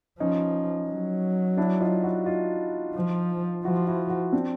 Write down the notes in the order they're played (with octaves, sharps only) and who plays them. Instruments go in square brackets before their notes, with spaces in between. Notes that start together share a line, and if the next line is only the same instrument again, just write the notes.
[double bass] F3 [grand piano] C#4 D#4
[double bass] F#3
[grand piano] D4 E4
D#4 F4
E4 F#4
D#4 F4
[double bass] F3
[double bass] F3 [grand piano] E4 F#4
[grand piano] E4 F#4
E4 F#4
C4 D4